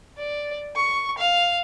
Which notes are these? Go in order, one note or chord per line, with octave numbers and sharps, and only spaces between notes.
D5
C#6
F5